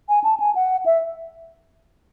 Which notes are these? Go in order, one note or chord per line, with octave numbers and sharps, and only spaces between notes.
G#5
A5
G#5
F#5
E5